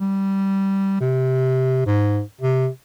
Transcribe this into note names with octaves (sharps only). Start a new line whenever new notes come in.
G3
C3
G#2
C3